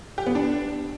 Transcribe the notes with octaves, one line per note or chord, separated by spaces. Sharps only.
G4
B3
D4